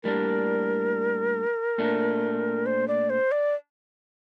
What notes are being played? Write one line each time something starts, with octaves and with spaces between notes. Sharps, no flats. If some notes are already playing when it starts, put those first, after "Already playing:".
A2 G3 A#3 D4 A#4
A#2 A3 D4
C5
D5
C5
D5